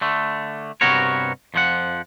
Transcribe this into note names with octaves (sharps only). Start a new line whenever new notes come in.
D3 A3
G2 C3 B3 F#4 A#4 C#5
F2 F3 F#5